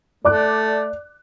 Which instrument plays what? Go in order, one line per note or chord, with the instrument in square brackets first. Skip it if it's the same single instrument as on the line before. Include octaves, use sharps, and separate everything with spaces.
[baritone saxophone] A3 [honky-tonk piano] D5 D6 F#6